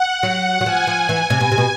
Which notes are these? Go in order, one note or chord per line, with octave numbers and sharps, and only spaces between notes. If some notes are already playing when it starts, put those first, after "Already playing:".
Already playing: F#5
F#3
F#3
F3 G#5
F3
E3
C3
B2
C3
B2